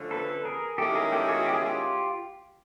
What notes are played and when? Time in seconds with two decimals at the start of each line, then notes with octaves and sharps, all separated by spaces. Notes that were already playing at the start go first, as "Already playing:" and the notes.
Already playing: D3 F3 A3 C#4
0.11 A4 B4
0.45 G#4 A#4
0.78 G#2 D#3 G#3 C#4 E4 G4 A4
0.95 G#4 A#4
1.12 G4 A4
1.28 F#4 G#4
1.46 G4
1.54 G#4
1.63 F4 G4